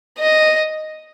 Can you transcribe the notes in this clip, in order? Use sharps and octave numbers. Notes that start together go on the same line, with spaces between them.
D#5